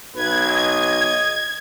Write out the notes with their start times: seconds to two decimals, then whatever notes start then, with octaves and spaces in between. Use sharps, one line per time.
0.15 B1 B4 G#6
0.49 D#5